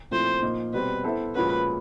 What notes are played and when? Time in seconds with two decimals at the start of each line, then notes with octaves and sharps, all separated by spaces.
0.11 A#2 F3 A3 C4 E4 C5
0.42 A#2 F3 A#3 D#4
0.73 B2 G3 C4 B4
1.04 B3 E4 A4 C5 E5
1.35 A#2 F3 G#3 C#4 F#4 B4